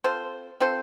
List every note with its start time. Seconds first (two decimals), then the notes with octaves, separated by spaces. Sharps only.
0.04 C4 F4 A4 C5
0.60 C4 F4 A4 C5